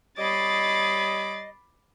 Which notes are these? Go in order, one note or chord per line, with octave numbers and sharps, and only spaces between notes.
G3 C#5 D#5 B5 D6 A6 C7